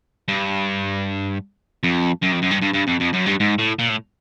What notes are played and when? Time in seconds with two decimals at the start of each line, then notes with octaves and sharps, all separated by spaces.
0.28 G2
1.84 F2
2.23 F#2
2.32 F2
2.43 F#2
2.51 G2
2.62 G2
2.74 G2
2.88 F2
3.01 F2
3.14 F#2
3.26 G2
3.40 G#2
3.58 A2
3.79 A#2
3.89 A2